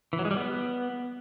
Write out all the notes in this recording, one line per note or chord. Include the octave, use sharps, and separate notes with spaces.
E3
F#3
G#3
G3
B3